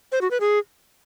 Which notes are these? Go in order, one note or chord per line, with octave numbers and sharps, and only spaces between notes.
C5
F#4
B4
G#4